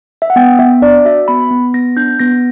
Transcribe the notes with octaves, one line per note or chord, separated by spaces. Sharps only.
E5
F#5
B3 G5
B3 E5
D4 D5
F#4 E5
B3 B5
B3
B3 A#6
D4 G6
B3 A#6